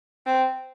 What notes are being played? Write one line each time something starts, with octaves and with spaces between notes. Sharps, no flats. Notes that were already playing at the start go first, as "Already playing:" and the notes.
C4